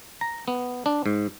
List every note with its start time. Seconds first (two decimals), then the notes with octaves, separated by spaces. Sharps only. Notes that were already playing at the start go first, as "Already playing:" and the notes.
0.21 A#5
0.48 B3
0.86 D4
1.06 G#2